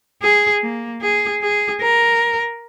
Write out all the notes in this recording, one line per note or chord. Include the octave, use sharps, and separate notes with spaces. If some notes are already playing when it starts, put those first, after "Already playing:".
G#4
A#3
G#4
G#4
A#4